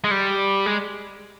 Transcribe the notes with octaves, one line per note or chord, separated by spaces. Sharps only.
G#3
G3
G#3